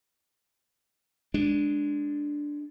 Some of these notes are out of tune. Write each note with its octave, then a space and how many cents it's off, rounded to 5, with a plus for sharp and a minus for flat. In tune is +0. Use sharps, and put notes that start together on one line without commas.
G#3 +0 D4 +0